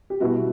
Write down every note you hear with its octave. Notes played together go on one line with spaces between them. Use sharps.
G4
B2 G3 E4 F#4